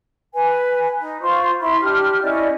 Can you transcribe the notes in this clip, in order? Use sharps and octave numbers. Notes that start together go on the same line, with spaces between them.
B4 G#5
D#4
F4 C5 C#6
E4 E5 B5 C6
D4 G4 F6
C#4 E4 D5 D#5